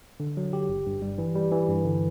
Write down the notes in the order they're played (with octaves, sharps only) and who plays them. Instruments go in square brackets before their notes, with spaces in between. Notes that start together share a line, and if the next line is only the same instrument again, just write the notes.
[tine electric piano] D3
F#3
G4
G1
G2
G3
E3
G3
E3
G2
D3